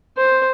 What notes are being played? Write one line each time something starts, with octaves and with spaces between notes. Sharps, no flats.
C5